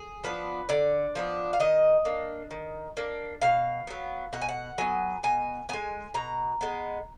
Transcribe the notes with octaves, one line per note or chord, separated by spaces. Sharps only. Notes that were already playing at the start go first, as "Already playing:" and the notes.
Already playing: G#4
F3 B3 D4 B4
D3 D5
F3 B3 D4
F5
D#3 D#5
A#3 D4
D#3
A#3 D4
B2 F5
F#3 B3
B2 F#5
G#5
F#5
F#3 B3 G#5
B2 G#5
G#3 B3 G#5
B2 A#5
G#3 B3